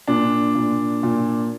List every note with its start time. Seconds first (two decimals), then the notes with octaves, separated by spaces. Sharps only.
0.07 A#2 D4
0.55 A#2
1.03 A#2